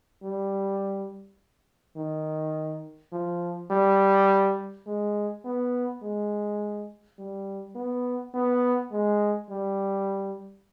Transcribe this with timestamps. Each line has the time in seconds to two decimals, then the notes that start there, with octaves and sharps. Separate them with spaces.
0.23 G3
1.96 D#3
3.12 F3
3.71 G3
4.87 G#3
5.45 B3
6.03 G#3
7.19 G3
7.75 B3
8.34 B3
8.92 G#3
9.50 G3